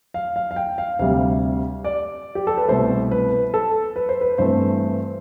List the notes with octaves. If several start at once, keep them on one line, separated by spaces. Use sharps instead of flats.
F5
F5
F5
G5
F5
D2 C3 G3 F5
D5
G4
A4
B4
C2 B2 A3 C5
B4
A4
B4
C5
B4
G2 E3 A3 C4 C5